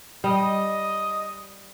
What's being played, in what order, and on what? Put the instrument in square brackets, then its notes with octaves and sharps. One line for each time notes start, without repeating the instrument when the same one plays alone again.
[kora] G3 [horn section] D#5